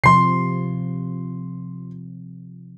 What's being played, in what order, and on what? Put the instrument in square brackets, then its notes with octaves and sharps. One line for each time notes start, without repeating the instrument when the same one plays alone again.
[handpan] C3 F3 [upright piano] C6 C7